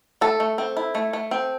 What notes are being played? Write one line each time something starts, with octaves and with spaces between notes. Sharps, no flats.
A3 A4
A3
C4
E4
A3
A3
C4